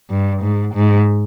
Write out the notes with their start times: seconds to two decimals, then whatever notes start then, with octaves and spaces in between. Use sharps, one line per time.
0.11 G2
0.42 G#2
0.75 G#2